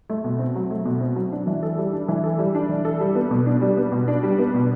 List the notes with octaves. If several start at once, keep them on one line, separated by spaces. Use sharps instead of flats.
A3
B2
C4
F#3
A3
B2
C4
F#3
D4
E3
A4
G3
D4
E3
A4
G3
D4
E3
A4
G3
B3
B2
D4
G3
B3
B2
D4
G3
B3
B2